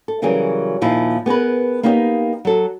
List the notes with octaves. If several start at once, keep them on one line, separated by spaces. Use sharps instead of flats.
A4
C#3 E3 F#3 G3 G#4 A#4
D#2 A#2 F3 D#4 E4
B3 G#4 A#4 B4
A#3 B3 D#4 G4 D5 D#5
F#3 A4